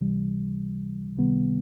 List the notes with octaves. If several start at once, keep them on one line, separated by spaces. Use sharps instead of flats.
C#2 C3 E3 G3
C#2 C3 D#3 G3 B3